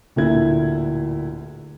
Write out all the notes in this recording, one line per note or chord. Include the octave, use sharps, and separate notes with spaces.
D1 A#2 D3 E4 G#6